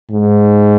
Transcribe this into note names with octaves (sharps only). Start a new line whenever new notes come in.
G#2